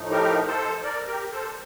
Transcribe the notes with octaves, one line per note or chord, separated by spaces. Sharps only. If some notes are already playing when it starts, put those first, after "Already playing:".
Already playing: A2 F3 A3 D#4
G4 A#4
A4 C5
A#4 D5
G4 A#4
A4 C5